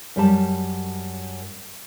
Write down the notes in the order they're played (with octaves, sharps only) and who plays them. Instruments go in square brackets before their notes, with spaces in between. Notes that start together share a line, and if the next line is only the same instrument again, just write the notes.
[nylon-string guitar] F#2 G3 A5